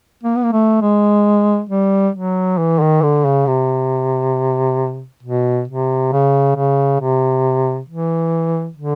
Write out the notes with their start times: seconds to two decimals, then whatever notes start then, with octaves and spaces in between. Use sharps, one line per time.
0.23 A#3
0.36 B3
0.44 A#3
0.52 A3
0.81 G#3
1.69 G3
2.15 F#3
2.58 E3
2.80 D#3
3.03 D3
3.25 C#3
3.47 C3
5.23 B2
5.68 C3
6.12 C#3
6.56 C#3
7.00 C3
7.89 E3
8.76 D3